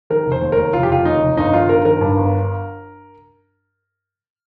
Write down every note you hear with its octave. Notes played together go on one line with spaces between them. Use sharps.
D#3 A#4
F1
C5
D#2
A#4
D#2
F1 F4
G4
F1 F4
D#2 D#4
F1
G1 D#4
D#3 F4
G1 A#4
D#3 A#4
G2
G1